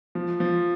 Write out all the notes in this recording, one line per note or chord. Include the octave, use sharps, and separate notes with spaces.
F3
F3